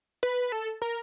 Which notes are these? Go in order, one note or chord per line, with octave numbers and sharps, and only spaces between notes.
B4
A4
A#4